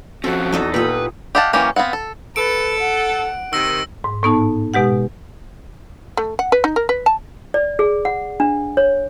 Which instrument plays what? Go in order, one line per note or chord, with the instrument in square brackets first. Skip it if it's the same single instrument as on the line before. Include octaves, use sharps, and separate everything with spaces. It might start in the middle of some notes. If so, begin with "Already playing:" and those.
[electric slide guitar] F3 C4 C#4 [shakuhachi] F#4 [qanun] A4
[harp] E2 [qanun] D#4 A4 D#5
[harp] A#2 F4 D#6 [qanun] G4 F#5 [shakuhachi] A4 [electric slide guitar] B4
[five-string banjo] G4 D#5 F5 F#5 A5
E3 F#3 A#3 C#4 G4
B3 C4 F5 F#5
A4
[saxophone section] A4 [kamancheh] B4 [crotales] D7
[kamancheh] F#5
[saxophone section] C3 D#3 [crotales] E6 A#6
[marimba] G#2
A2 B3 D#4 A5
B2 G#3 G4 F#5
[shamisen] A3
F#5
B4
D#4
A#4
B4
A5
[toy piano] D5
G#4
F#5
D4
C#5